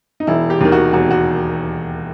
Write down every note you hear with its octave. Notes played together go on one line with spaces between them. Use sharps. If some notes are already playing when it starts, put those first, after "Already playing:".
D#4
E1 E4
G4
D#2 D#3
F#4
E1 F#4
F#4